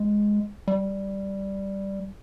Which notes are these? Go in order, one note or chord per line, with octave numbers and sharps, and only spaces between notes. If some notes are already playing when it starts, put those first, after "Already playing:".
Already playing: G#3
G3